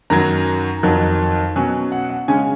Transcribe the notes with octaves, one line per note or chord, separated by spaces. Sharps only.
F#2 D#3 F#3 A#5
F2 D#3 F#3
B2 F#3 C#4 G#5
F#5
F#5
C#3 G#3 C#4 G#5